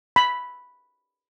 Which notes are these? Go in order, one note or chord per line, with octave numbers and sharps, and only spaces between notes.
B5